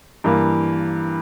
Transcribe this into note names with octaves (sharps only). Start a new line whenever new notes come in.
G2 E3 A#3